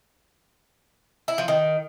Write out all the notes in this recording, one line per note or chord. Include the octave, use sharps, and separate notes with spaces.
E4
F3
D#3